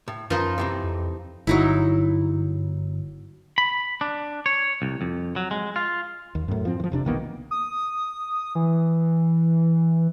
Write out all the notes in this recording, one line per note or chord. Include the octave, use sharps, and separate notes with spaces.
A2
F#2 F3 D#4 F4 A#4 B4
C3 E3 C4
F2
G1 F#3 D#4 E4
B5
D4
C#5
C2
F2
F#3
G#3
F4
D#2
F#2 A2
F3 C4
E3 F3
F1 C3 D4
B1 D#3 A#3 B3
D#6
E3